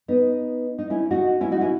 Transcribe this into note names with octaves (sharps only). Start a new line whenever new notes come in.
B3 D#4
D#4
C#4 E4
D#4 F#4
C#4 E4
D#4 F#4
C#4 E4